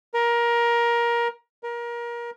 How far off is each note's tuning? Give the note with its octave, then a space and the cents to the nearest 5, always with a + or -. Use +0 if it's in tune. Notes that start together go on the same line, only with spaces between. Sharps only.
A#4 +20
A#4 +25